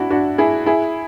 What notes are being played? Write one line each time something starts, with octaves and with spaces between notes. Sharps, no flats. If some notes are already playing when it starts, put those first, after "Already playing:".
Already playing: D4 E4 F#4
D4 F#4
E4 G#4
E4 G#4